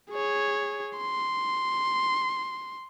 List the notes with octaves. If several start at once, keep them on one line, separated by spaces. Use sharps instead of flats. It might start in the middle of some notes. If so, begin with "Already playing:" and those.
G#4 C#5
C6